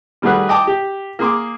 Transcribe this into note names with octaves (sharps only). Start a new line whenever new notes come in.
D#3 G3 A3 F#4 G#4 B4
D#5 G5 A5 D6
G4
A#3 G#4 C6 D6